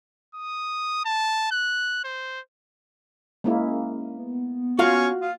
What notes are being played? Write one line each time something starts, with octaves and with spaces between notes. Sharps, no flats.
D#6
A5
F#6
C5
G#3 A#3 C#4 E4
B3
C#4 F4 F#4 F5 C#6
F4 D#6